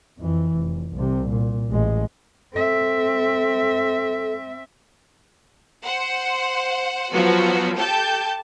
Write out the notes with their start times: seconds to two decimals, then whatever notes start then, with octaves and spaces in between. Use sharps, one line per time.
0.18 F2 E3
0.56 F1
0.94 C2 C3
1.29 A#2
1.69 A1 G#3
2.53 C4 A4 E5
5.84 C5 F#5
7.11 F3 F#3 B3 F#4
7.77 G4 A4 A5 G6